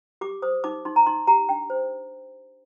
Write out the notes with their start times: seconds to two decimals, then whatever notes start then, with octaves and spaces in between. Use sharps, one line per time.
0.21 G4 D6
0.42 C5 D#6
0.64 D#4 D6
0.85 D#4 C6
0.96 A#5
1.06 D#4 C6
1.27 G4 A#5
1.49 D4 G5
1.70 C5